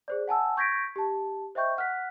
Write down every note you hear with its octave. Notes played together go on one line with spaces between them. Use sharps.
G#4 C5 D5
F#5 G#5 A5 E6
C#6 G6 G#6 A#6 B6 D7
G4 A5
C5 D#5 E5 G5 C#6 G6
F#5 F6 F#6 B6